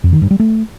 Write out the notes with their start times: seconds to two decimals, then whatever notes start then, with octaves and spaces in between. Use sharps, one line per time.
0.04 F2
0.13 D#3
0.22 G2
0.31 G3
0.40 A3